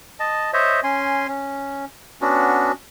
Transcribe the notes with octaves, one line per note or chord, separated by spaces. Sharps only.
D#5 A5
C5 C#5 D#5 E5
C#4 G#5 C6
C#4
B3 C#4 D4 F#4